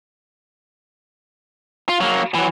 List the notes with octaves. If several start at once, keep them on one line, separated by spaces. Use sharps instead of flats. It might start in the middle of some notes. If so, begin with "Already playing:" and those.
F4
F#3 A#3
E3 F#3